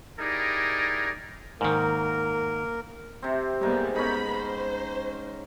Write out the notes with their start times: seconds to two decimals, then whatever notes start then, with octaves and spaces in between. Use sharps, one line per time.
0.19 D#4 E4 G4 G#4 A#4 D5
1.61 G#2 D#3 A#3 A#4
3.22 C3 C4
3.61 G#2 G3 A#3 B3 D#4
3.96 B3 C#4 D#4 A#4 B5
4.32 C5